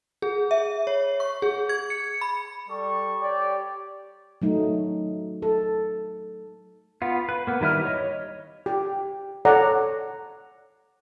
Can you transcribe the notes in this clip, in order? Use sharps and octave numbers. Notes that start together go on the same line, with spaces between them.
G#4
E5
C#5
C#6
G#4
G#6
C#7
B5
G3 A4 D5 C#6
G4 C#5 D5
F#3 A3 D#4
A4
B3 F4
B4
A#3 B3
D#3 G3 E4 B4 F6
C#5 D#5
G4
A4 C#5 D5 F#5 A#5